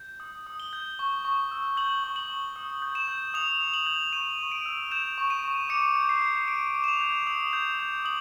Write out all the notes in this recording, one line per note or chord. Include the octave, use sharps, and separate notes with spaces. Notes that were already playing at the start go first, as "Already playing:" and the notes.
Already playing: G6
D#6
D#6
G7
G6
C#6
C#6
E6
G6 F#7
C#6
F#7
C#6
D#6
G6
E7
G6
D#6 F7
D#6
F#7
G6
C#6 D#7
C#6
D7
E6
G6 E7
C#6
D#7
C#6
D6 C#7
G6
C7
G6
D6 D7
D6
E7
F7
G6
D#6
G6
G6
D#6 F#7